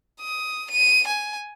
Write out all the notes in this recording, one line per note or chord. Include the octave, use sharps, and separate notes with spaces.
D#6
D#7
G#5